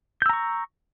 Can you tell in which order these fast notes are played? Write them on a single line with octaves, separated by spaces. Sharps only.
G6 E6 A#5 C#6